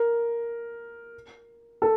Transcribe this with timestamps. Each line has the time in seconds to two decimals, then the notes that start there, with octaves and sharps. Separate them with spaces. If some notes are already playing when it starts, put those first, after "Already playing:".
Already playing: A#4
1.82 A4